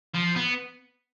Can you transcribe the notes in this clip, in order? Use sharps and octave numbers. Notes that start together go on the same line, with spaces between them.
F3
B3